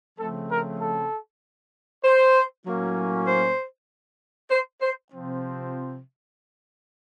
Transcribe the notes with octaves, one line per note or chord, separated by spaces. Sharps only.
C#3 F3 A3 C4 A4
A#4
A4
C5
A2 F#3 A#3 C#4
C5
C5
C5
C3 F3 C4